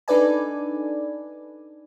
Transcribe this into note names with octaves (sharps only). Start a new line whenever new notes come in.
D4 D#4 A4 B4 D5 G#5